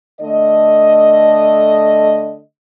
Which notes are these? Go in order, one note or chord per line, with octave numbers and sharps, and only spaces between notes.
D3 A3 D#5